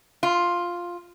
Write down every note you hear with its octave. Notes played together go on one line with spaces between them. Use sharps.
F4